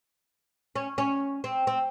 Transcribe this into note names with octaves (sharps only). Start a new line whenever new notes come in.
C#4
C#4
C4
C4